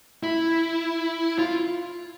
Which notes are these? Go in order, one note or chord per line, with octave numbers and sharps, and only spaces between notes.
E4
F4